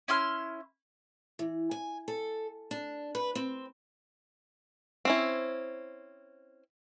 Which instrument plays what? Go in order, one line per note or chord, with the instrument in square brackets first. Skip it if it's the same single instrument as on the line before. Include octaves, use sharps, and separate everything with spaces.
[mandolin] C#4 E4 C6 F6
[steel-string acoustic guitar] E3
G#5
A4
D4
B4
C4
[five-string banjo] C4 C#4 E4